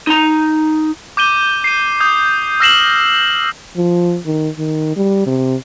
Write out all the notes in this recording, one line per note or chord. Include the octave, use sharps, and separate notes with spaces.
D#4 A#5
D6 G6 D#7 G7
C7 D#7
D#6 G6
E6 F6 A#6 C7 E7 F#7
F3
D#3
D#3
G3
C3